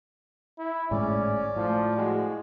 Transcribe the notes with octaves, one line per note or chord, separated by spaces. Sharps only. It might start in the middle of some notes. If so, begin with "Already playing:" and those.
E4
G#1 A2 G#3 C#4 D5
A2 F3
G#3 F#4